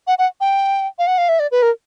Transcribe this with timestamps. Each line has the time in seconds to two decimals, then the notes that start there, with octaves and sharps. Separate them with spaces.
0.07 F#5
0.18 F#5
0.41 G5
0.99 F5
1.07 F#5
1.18 F5
1.29 E5
1.39 D5
1.51 B4
1.62 A#4